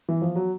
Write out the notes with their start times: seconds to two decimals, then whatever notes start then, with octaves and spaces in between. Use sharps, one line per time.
0.09 E3
0.22 F3
0.36 F#3